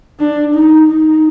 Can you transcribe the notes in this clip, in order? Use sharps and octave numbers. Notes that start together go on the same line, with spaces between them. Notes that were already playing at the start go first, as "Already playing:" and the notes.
D4
D#4
D#4